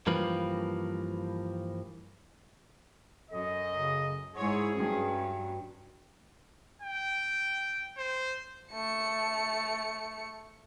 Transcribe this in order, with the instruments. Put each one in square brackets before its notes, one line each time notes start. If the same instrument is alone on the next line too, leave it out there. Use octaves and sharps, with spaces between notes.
[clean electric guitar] G2 E3 F3 A#3 B4
[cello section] F#2 [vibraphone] A4 [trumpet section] D#5
[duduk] C#3
[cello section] G#2 C#5 [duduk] E4 [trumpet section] G#4 [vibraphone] F#5 C6
[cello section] G2 F#3 [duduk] C#4 [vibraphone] F#4 G5
[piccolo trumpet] G5
C5
[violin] A3 C#7